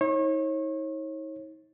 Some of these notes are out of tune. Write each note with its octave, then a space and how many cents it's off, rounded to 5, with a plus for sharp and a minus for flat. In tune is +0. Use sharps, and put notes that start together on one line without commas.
D#4 +40 C#5 -35